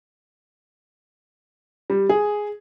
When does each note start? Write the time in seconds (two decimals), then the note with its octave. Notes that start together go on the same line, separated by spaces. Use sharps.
1.90 G3
2.09 G#4